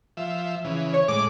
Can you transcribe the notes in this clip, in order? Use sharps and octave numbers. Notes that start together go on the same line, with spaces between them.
F3 E5
C#3 E3
C#5
A2 G#3 D6